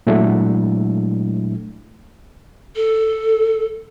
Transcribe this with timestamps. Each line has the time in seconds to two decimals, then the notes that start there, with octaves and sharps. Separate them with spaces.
0.07 A#2 F#3 G#3 A3 D4 E4
2.76 A4